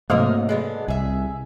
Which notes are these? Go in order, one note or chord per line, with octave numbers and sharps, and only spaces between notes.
G#2 C3 F#3 A3 A#3 D#4 A#4
G#3 B3 D4
C2 G#4 E5